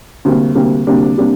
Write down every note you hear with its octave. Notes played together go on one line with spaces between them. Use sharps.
D2 C3 G3 A#3
D2 C3 G3 A#3
D2 C3 G3 A#3 D4
C3 G3 A#3 D4